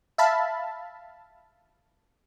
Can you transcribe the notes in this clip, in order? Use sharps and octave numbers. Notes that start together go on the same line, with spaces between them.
E5 F5 A5 B5